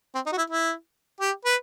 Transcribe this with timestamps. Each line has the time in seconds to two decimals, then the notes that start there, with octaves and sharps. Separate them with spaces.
0.15 C4
0.26 D#4
0.33 F#4
0.38 E4
0.50 E4
1.20 G4
1.45 B4